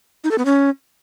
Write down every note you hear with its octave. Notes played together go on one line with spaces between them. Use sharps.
D#4
A4
B3
C#4